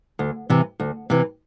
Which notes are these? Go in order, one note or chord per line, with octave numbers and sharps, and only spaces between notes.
D2
C3 E3
D2
C3 E3